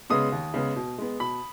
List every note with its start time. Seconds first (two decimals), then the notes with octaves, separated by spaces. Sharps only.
0.10 C#3 G#3 B3 D#6
0.32 D#2
0.54 C#3 G#3 B3
0.76 B2
0.98 G#3 B3
1.20 B2 B5